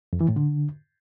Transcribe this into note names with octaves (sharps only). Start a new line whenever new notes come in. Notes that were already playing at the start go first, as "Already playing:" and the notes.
F2
E3
A2
D3